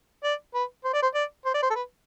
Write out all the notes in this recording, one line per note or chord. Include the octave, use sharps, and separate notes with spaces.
D5
B4
C5
D5
C5
D5
C5
D5
C5
A4
B4